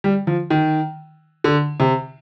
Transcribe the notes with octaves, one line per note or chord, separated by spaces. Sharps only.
G3
F3
D#3
D3
C3